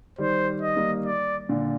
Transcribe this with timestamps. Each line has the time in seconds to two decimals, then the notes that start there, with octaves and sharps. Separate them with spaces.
0.18 D#3 G3 C5
0.62 D#5
0.76 G3 A#3
1.06 D5
1.49 A#2 D3